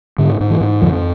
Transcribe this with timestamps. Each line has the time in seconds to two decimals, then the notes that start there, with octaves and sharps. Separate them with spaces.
0.18 G#2 D3
0.40 G#2
0.50 E3
0.61 G#2
0.82 F2 D3 F3